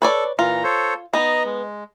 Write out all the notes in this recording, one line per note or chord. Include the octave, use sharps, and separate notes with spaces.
A4 B4 C#5 D5
A#2 E3 F4 A#5
A4 C5 C#5
B3 D#4 D#5 A#5
G#3